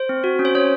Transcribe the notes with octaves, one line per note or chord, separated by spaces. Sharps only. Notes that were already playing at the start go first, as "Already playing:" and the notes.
Already playing: C5
C4
F#4
C#4
C5
C#4 C#5